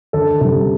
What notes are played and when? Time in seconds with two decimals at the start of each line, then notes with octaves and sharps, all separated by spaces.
0.13 D2 A4
0.40 C3 G3 A4